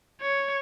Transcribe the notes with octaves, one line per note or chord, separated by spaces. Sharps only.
C#5